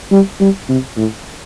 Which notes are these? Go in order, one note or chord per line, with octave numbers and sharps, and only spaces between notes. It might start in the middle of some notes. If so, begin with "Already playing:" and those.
G3
G3
C3
A2